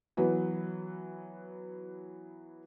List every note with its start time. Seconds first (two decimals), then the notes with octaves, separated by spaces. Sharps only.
0.17 E3 F#3 B3